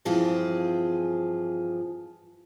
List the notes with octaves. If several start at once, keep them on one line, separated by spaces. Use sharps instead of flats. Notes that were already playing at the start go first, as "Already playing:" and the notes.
G2 E3 F3 C4 F4 G#4